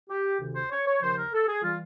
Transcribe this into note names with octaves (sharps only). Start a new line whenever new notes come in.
G4
D2 C3 D#3
C5
C#5
C#5
D#2 C#3 F3 C5
A#4
A4
G#4
E3 G3 F4